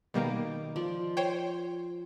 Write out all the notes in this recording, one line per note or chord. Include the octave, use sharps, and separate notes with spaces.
B2 D#3 G3 A#3 D6
F3 D5
C5 C#5 G5